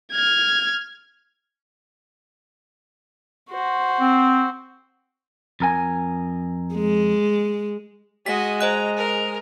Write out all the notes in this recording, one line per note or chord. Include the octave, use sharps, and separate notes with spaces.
F6 G#6
F#4 C5
C4
F2 A#4 G#5
G#3
G#3 F#4 D#5 B6
C5 D#5 A#5 F#6
A#4